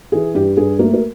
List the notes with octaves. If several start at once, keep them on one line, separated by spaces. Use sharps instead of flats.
E3 G#4
G2 G4
G2 G#4
A3 A#3 A#4
A#4